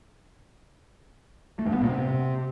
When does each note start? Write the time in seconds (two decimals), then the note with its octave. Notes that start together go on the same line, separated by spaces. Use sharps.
1.59 A3
1.67 G2
1.74 B3
1.81 A#2
1.89 C3